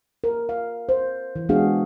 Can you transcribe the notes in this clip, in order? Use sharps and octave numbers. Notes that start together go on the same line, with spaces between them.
A#4
F5
C5
E3
G#3 B3 D4 F#4 G#4 F5